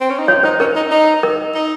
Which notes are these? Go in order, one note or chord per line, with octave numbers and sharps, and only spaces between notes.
C4
C#4
D#4
F4 C#5
D#4 C5
C#4 A#4
D#4
D#4
A#4
D#4